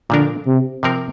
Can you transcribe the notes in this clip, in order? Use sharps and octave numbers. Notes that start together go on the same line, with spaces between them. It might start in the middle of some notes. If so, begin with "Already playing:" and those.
A#2 D3 F3 D4 A#4
C3
C3 F3 C4 A#4